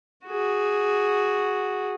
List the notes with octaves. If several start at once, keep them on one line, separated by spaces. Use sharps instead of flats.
F#4 G#4